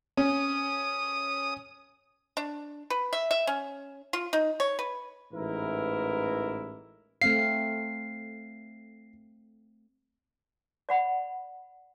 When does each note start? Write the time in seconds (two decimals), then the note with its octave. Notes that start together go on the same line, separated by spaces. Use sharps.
0.17 C#4 D#6
2.37 D4
2.90 B4
3.13 E5
3.31 E5
3.47 C#4
4.13 F4
4.33 D#4
4.60 C#5
4.79 B4
5.33 A1 G#2 E3 E4 A#4
7.22 A3 C4 F5 C7
10.89 D5 F#5 B5